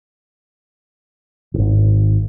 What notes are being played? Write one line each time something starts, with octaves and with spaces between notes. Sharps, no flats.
D#1 G#1